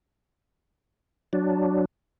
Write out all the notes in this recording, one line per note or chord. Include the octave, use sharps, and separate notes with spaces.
F#3 D4